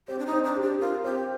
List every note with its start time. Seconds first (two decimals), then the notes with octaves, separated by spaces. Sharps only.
0.08 C4 G4
0.19 D4
0.26 D#4
0.32 C4
0.44 D4
0.56 G4
0.62 D4
0.80 F4 A#4
1.04 C4 G4